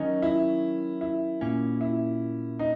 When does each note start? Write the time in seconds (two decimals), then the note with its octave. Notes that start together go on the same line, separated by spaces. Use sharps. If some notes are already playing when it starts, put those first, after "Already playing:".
Already playing: D#3 F#3 C#4 D#4
0.22 E4
1.01 E4
1.41 A#2 A#3 C#4
1.81 E4
2.59 D#4